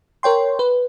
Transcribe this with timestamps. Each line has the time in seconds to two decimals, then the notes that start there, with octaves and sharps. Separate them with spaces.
0.23 A#4 C#5 G5 C6
0.59 B4